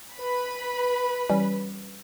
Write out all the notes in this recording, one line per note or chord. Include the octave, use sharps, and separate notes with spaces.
B4 B5
E3 G3 C#4